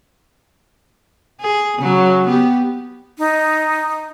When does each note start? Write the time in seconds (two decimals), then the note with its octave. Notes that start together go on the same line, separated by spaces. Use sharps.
1.41 G#4
1.78 C#3 F#3
2.26 B3 G4
3.18 D#4